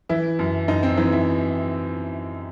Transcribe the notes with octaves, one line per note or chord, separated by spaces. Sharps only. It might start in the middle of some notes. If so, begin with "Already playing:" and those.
E3 E4
F#2
F#2 D#4
C4
E3 D#4
E4